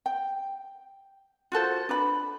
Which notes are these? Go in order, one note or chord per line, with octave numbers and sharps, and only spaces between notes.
G5
F4 F#4 A4 C5
D4 B4 B5